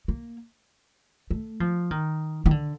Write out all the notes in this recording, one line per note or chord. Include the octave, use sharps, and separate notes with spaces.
A#3
A3
F3
D#3
D#3
D3